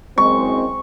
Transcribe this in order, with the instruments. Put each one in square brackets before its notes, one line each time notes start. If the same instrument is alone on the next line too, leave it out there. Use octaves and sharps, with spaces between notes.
[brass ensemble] F#1 G#3 C4 [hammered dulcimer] C#6